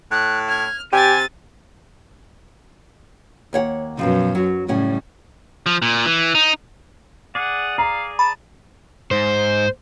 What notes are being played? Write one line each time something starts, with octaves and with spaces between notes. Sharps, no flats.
A2 F#6
F6 G#6
C3 G4 G#5 A6 D#7
D#2 C#5 F#5
F#2 B2 D#3 F3
F#3
A2 C#3 G3 C#4 F#5
F3
A#2
E3
D#4
G#4 D5 F#5
F5 A#5
A5 B5
G#2 C5